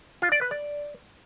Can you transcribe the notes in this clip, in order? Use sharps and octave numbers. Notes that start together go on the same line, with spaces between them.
F4
D5
B4
D5